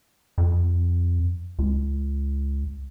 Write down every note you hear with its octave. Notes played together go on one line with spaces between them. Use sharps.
F2
C#2